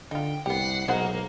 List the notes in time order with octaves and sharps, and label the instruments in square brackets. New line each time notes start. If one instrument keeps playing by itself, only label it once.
[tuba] D3 [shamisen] D#4 F4 [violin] G5
[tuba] C2 [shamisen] B3 G4 [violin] F#5 C7
[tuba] B1 [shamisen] G#3 C5 F#5 [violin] A#3